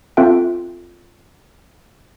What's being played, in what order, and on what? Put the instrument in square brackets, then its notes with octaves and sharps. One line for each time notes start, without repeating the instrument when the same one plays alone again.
[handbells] C4 F4 A4 E5 G5